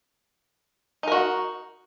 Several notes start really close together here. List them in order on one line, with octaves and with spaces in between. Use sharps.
D#4 A#4 F#4